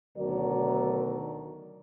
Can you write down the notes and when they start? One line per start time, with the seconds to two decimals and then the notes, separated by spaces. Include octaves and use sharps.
0.17 D2 B2 D#3 F#3 A#4 D5